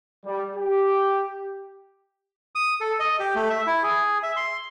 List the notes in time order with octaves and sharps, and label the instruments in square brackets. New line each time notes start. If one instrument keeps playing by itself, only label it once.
[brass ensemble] G3
G4
[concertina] D#6
A4
D#5
G4
A3
E5
E4
G#4
E5
C6